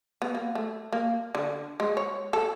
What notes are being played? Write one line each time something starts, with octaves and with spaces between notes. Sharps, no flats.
B3
A#3
A3
A#3
D3
G#3
C#5
A4